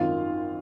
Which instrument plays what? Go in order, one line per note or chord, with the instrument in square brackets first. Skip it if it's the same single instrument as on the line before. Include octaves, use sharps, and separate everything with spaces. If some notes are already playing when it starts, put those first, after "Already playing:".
Already playing: [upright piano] G#1 F#2 D#3 F4 F5